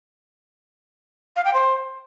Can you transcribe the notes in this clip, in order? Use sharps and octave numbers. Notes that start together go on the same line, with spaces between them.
F5
G5
C5